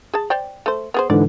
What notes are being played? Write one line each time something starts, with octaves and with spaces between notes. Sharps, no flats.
G#4 A5
C5 D5 G5
A3 C5
B3 G#4 C5
G#2 D3 E3 D5